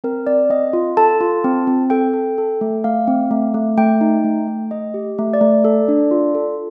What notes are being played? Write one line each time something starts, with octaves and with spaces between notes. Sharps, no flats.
C4 A#4
C4 D5
C4 D#5
F4
A4 A5
F4
C4
C4
A4 G5
A4
A4
A3
A3 F5
C4
A3
A3
A3 G5
D#4
A3
A3
A3 D#5
G4
A3
D5
A3
A4
D4
F4
A4